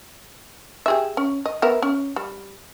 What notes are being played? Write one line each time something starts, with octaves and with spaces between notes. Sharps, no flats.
G4 G#4 E5
C#4
D#5
B3 A#4 E5
C#4
G3